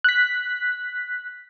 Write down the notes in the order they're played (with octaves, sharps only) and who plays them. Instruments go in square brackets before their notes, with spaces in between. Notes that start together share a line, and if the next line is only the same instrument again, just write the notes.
[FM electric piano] F#6 B6